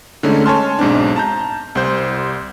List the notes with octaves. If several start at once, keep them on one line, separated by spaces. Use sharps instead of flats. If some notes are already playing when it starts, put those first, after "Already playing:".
D3 G#3 A3 C#4 D#4
C#5 G#5 A5 C6 F6
B1 G#2 C4 D4
A5 A#5 G6
C2 G3 C5 G6